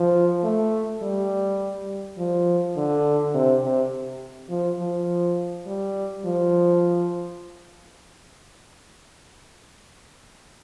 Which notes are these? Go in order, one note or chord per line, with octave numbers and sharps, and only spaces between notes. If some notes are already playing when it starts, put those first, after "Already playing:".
Already playing: F3
A3
G3
F3
D3
C3
C3
F3
F3
G3
F3